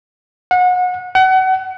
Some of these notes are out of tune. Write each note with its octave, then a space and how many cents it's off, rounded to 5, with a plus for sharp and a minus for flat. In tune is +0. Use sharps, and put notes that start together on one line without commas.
F#5 -30
F#5 +30